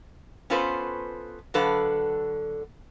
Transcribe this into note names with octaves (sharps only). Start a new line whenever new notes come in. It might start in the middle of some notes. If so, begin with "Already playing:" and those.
B3 C#4 F4 A4 B4 C5
D3 F#3 A4 B4 F5